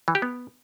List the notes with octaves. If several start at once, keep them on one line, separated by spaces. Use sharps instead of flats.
E3
G4
B3